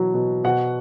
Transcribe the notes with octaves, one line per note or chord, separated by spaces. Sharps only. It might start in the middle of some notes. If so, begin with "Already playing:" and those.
Already playing: B2 E3 F#3
B2
B2 F#5